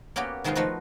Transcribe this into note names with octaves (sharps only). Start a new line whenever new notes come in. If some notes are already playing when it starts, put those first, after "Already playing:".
A#3 B3 C#4 F#4 G4
C3 D#3 G#3 B3 C4 F4
F3 A3 D#4 F4 F#4 B4